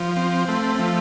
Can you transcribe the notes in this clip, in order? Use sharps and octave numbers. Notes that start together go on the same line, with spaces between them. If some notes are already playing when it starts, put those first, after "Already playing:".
Already playing: F3
C4
A3
F3